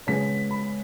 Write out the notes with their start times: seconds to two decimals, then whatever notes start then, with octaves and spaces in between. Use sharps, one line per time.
0.07 C#3 G#3 B3 B6
0.51 B5